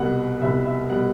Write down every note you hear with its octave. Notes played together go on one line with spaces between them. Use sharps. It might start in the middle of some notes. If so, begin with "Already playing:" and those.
Already playing: C2 B2 G3 F#5
C2 B2 G3 E5
E5
B2 G3 F#5